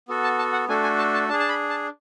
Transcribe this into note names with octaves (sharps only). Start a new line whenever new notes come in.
B3 F#4 A4
A5
A5
F#5
A3 D4 F#4 A4 G#5
G#5
A5
A5
D4 G#4 A5
A5
B5
A5